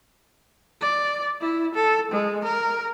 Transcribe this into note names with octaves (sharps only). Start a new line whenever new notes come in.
D5
E4
A4
G#3
A#4